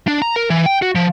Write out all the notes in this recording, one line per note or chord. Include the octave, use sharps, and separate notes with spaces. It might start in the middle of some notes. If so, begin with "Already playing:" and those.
D4
A#5
A#4
E3
G5
F#4
F3